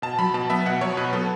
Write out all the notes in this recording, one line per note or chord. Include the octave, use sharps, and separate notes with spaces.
B2 A5
F#3 B5
B2 A5
B3 E5
B2 F#5
F#3 C#5
B2 B4
B3 A4